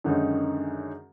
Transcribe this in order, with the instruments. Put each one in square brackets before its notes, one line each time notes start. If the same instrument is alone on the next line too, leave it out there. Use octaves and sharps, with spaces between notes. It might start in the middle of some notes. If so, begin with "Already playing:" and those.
[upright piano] F#2 D3 D#3 G#3 C#4 D#4